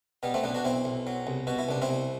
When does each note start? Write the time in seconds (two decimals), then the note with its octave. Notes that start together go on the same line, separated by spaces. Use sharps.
0.23 B2 G3 B3
0.34 A3 C4
0.44 B1 B3 D4
0.54 D4 F#4
0.64 B1 C4 E4
0.85 B1
1.07 F#3
1.27 C2
1.47 B2 F#4
1.59 E4
1.69 C2 D4
1.82 C4 E4
1.89 C2